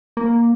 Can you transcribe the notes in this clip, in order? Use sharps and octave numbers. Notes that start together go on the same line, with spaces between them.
A#3